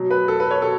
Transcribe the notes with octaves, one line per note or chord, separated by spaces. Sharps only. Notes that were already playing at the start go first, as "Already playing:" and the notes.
Already playing: B2 F#3
B4
A4
B4
C#5
B2 A4